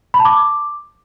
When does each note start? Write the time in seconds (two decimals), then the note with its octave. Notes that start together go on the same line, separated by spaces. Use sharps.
0.14 B5
0.20 A5
0.25 D6